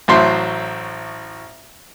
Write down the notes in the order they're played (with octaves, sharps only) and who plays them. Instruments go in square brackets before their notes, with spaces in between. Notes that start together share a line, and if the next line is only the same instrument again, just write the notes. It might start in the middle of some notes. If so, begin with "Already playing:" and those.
[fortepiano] A1 A2 F#3 C5 E5 C6